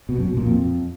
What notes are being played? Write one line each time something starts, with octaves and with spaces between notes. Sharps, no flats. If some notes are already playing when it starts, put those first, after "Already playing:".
B2
F#2
B2
A#2
F2